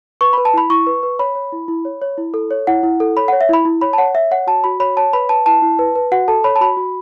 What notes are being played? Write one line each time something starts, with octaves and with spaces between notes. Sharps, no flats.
B4 C#6
B4 B5
A5
E4 B5
E4 C#6
B4
B4
C#5 B5
C#5
E4
E4
C#5
C#5
E4
A4
C#5
E4 F#5
E4
A4
C#5 B5
C#5 F#5
E5
E4 B5
E4
C#5 B5
A5
C#5 F#5
C#5 E5
C#5 F#5
F#4 A5
F#4 B5
C#5 B5
C#5 A5
B4 B5
B4 A5
E4 A5
E4
B4
B4
F#4 F#5
A4 A5
C#5 B5
A5
F#4 B5
F#4